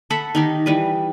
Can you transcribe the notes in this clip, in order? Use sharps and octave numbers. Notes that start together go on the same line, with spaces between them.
A4 E5 F#5 B5
D#3 D#4 G4
E3 G3 B4